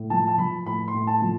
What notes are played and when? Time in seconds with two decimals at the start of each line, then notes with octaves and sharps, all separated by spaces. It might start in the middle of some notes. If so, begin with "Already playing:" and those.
Already playing: A2
0.10 F3 A5
0.28 A5
0.38 F3 B5
0.66 A2 B5
0.88 C6
0.94 A2
1.07 A5
1.22 F3